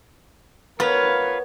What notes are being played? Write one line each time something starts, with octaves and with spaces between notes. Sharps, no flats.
B3 F4 A#4 B4 C#5 F5